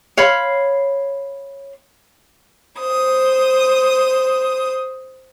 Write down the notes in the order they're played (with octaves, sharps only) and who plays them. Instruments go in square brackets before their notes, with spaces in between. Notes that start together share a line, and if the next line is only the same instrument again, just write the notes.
[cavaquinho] C#5 F5 B5 C6
[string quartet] C5 D#6